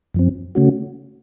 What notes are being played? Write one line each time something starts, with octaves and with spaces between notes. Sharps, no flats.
F#2 F3 C4
C#3 A3 C#4 F#4